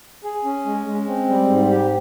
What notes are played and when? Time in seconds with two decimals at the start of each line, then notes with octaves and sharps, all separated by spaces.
0.24 G#4
0.45 C#4
0.65 G#3
0.87 G#3
1.08 C4
1.28 G3
1.48 G#2
1.70 G4